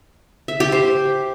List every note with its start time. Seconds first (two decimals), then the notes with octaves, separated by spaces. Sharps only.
0.48 E5
0.60 G4
0.72 C5